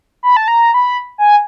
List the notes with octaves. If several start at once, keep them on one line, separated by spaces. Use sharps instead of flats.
B5
A5
A#5
B5
G#5